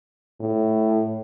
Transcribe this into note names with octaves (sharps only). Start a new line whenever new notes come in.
A2